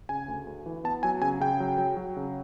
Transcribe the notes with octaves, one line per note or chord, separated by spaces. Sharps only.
C#3 G#5
D2
D2
E3
B3 A5
F#3 G#5
C#3 G#5
C#3 G5
F#3
F#3
F#3
C#3